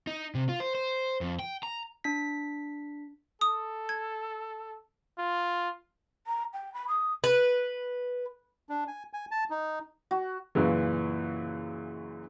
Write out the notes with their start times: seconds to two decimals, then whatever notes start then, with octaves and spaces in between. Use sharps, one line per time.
0.07 D#4
0.35 C3
0.49 F4
0.60 C5
0.75 C5
1.21 F2
1.39 G5
1.63 A#5
2.04 D4 B6
3.41 A4 D#6
3.89 G#6
5.18 F4
6.27 A#5
6.54 G5
6.74 B5
6.88 D#6
7.24 B4
8.69 D4
8.88 G#5
9.13 G#5
9.31 A5
9.50 D#4
10.11 F#4
10.55 F#2 A#2 C#3 E3